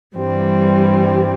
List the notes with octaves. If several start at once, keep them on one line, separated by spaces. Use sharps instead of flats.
G2 E3 G3 C4